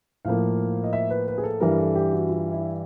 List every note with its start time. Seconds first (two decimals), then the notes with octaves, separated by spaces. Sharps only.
0.25 A2 F3 A#3 F5
0.84 D#5
0.93 E5
1.10 B4
1.28 B4
1.38 G#4
1.44 A4
1.60 G2 E3 G3 A#4
1.78 A4
1.96 G4
2.13 F#4
2.29 F4
2.52 E4